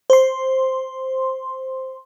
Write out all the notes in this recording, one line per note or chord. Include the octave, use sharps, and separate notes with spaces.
C5 C6